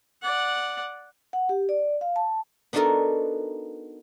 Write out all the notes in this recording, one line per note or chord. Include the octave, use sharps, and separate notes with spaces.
D5 F#5
F#5
G4
D5
F5
A5
B3 D4 D#4 F#4 A4 A#4